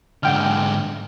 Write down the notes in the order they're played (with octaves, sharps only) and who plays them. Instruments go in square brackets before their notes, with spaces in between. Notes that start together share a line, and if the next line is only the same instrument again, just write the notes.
[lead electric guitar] G#2 D3 [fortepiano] F#5 G5 F6